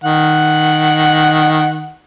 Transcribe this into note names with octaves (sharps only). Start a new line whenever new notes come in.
D#3 F#5